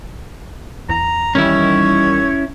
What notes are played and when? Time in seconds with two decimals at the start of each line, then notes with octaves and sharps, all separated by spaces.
0.89 E2 A#5
1.35 D#3 E3 G3 C#4 E4 C#5